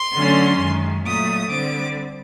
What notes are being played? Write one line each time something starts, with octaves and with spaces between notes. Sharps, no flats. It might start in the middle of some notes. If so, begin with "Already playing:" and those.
Already playing: C6
D3 F#3 A3 C#4
F#2 D#3 G#3
A#2 F#3 A3 D#6
D3 G3 C4 D6